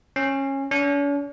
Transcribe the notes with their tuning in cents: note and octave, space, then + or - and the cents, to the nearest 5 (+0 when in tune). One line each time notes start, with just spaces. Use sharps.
C#4 -20
C#4 +45